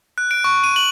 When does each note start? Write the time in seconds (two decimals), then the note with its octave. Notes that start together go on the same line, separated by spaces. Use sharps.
0.18 F#6
0.31 D7
0.44 C#6
0.64 D#7
0.76 F#7